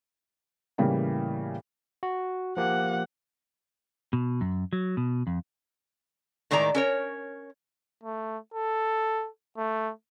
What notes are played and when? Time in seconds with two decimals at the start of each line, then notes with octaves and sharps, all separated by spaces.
0.78 A2 C#3 E3 G3 A#3
2.03 F#4
2.57 F3 A#3 G4 F#5
4.13 B2
4.41 F#2
4.73 F#3
4.97 B2
5.27 F2
6.51 A2 D#3 G#3 D5 A#5
6.75 C#4 A#4 C#5
8.04 A3
8.54 A4
9.57 A3